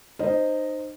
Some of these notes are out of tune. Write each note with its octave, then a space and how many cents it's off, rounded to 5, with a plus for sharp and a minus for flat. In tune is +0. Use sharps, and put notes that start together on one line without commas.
D#4 -30 C5 +0 D#5 +0